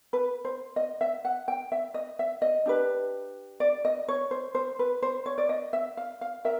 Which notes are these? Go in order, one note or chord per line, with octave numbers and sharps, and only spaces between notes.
B4
C5
D#5
E5
F#5
G5
E5
D#5
E5
D#5
D4 G4 B4
D5
D#5
C#5
C5
C5
B4
C5
C#5
D5
D#5
E5
F5
F5
A#4 E5